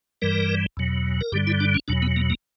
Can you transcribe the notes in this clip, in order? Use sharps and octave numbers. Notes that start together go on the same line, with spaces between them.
G2 E3 G3 A#4
E2 B2 F#3
A#4
G2 D3 G3 G4
E4
D4
C#4
E2 B2 F#3 D4
B3
A#3
A#3